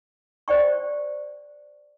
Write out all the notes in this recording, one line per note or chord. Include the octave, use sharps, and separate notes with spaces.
C5 D5 G5 C#6